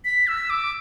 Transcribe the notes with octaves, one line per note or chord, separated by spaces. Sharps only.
B6
E6
D6